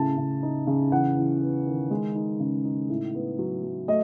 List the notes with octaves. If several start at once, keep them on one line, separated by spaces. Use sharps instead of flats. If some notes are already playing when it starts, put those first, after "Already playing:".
Already playing: A2 C#3 A5
C#3
D#4
C#3
E2 F#5
E2
B3
D#3
G#3
D#4
C#3
D#4
A2
B3
F#3
F#3
A3 D#5